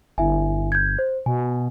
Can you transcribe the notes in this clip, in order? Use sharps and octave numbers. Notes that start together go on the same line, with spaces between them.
G1 E4 E5 G#5
G6 G#6
C5
B2 G#5